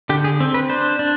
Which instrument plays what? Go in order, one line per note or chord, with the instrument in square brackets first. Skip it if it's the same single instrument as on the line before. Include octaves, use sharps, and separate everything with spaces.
[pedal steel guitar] D3 G4
G#4
C4
B4
D4 C5
D4